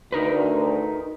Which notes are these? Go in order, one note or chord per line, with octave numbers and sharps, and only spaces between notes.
D2 D#4 A#4 B4